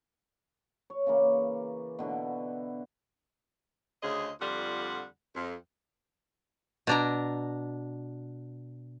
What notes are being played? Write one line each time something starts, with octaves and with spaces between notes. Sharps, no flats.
C#5
C#3 E3 A#3
B2 D3 E4 F#4
D2 C#3 G#4 C5 D#5
F2 D3 G3 F4 F#5
F2
B2 D4 A#5